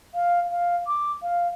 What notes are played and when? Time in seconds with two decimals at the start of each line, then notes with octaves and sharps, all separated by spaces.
0.15 F5
0.51 F5
0.87 D6
1.23 F5